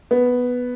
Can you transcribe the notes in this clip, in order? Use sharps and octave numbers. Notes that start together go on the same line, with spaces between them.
B3